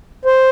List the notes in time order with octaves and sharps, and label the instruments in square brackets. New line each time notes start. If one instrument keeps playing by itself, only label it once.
[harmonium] C5